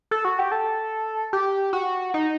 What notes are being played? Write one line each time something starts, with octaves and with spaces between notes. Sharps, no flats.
A4
F#4
G4
A4
G4
F#4
D#4